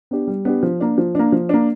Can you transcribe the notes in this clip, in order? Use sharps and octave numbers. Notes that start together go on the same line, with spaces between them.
B3 D4 G4
G3
B3 D4 G4
F3
A#3 D4
F3
A#3 D4
F3
A#3 D4